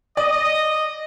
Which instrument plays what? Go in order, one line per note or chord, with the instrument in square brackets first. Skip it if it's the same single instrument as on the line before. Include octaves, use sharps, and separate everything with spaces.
[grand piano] D5 [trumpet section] D#5